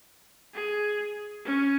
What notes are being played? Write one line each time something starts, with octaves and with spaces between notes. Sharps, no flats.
G#4
C#4